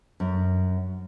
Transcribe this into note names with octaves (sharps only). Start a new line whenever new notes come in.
F#2